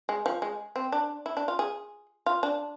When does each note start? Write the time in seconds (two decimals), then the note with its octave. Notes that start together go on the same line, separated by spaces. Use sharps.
0.09 G#3
0.26 F3
0.42 G#3
0.76 C4
0.92 D4
1.26 E4
1.37 D4
1.48 F4
1.59 G#4
2.26 F4
2.43 D4